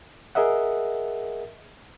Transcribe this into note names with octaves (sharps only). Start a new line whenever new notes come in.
G#4 A#4 D#5 E5 F#5